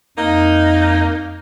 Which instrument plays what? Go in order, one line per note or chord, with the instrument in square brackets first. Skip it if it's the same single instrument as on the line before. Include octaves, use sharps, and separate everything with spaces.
[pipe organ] F2 [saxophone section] A#3 D#4